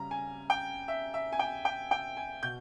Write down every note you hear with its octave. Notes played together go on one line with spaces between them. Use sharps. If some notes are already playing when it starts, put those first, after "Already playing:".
Already playing: C#3 G3 A#5
G#5
G5
E5
E5
G#5
G5
G5
G5
G#5
B2 G6